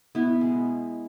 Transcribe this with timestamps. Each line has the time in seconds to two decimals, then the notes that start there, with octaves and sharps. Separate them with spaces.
0.15 B2 B3 E4
0.41 G#3